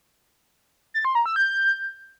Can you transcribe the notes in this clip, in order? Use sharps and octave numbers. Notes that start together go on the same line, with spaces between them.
A6
C6
A#5
E6
G6